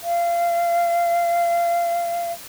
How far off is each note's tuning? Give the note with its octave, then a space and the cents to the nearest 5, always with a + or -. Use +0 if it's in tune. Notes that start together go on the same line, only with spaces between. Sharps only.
F5 -25